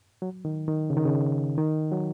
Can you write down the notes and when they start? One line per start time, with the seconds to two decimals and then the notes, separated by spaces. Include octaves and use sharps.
0.22 F#3
0.45 D#3
0.68 D#3
0.90 C#3
0.97 D#3
1.05 C#3
1.58 D#3
1.92 F#3